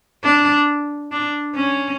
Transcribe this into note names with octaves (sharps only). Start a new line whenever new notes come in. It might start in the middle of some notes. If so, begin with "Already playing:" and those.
D4
D4
C#4